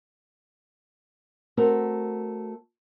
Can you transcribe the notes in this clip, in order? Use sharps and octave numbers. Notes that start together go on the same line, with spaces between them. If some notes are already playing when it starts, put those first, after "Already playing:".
A3 C4 F#4 A#4